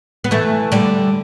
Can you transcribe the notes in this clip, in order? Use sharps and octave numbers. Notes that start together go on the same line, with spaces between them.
B3
E3 A3
D3 G3